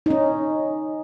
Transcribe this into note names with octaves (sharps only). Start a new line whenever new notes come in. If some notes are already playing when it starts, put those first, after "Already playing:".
C#4 D#4